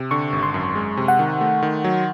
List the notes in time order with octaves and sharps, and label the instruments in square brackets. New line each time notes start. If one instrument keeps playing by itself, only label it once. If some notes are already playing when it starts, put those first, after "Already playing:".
Already playing: [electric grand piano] C3
[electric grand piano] D3 [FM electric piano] C#6
[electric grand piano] G#1
[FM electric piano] C6
[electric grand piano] F#2
G#3
C3
[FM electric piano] F#5
[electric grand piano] D#3
A3
D#3
F#3